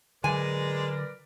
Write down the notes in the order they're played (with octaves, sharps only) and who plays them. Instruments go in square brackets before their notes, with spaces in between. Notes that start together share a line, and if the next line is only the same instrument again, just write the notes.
[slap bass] D3 F#3 [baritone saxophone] G#3 [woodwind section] A#4 B4 D5 [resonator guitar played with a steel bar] G#5